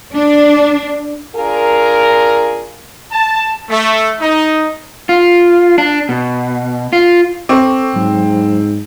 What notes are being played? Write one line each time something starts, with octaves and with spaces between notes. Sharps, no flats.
D4
D4 F4 G#4 A#4
A5
A3
D#4
F4
D4
B2
F4
C4 A4 C#6 D6
G#2 F#3